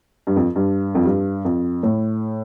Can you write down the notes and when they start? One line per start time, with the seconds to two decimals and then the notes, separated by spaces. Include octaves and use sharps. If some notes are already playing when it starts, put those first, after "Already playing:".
0.27 G2
0.36 F2
0.56 G2
0.95 F2
1.05 G2
1.45 F2
1.83 A2